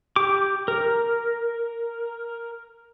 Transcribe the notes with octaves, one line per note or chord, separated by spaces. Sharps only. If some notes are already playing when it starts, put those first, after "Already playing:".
G4 D6
A#4